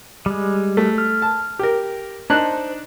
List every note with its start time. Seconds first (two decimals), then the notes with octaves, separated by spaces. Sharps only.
0.26 G3 G#3
0.77 A3
0.98 F6
1.22 A5
1.59 G4 A#4
2.30 D4 D#4 C5 F#6